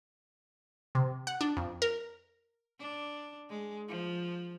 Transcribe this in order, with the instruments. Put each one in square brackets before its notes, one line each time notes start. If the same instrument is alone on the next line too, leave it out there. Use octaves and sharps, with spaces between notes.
[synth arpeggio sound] C3
F#5
D4
F2
A#4
[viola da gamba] D4
G#3
F3